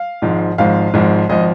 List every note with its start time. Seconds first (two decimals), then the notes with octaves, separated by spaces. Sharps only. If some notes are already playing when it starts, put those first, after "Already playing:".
Already playing: F5
0.22 G#1 G#2 F3
0.58 G#1 G#2 F3 F5
0.93 G#1 G#2 F3
1.29 G#1 F3 D#5